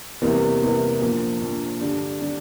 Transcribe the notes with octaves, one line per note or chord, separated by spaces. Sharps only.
E2 C3 E3 G3 A#3
E2 C3 E3 G3 A#3
A#1 A#2 F3
A#1 A#2 F3
G2 D3 G3 D4
D3 G3 D4